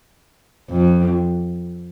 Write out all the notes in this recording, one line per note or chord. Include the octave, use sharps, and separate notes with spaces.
F2